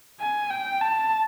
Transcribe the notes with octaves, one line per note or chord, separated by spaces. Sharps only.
G#5
G5
A5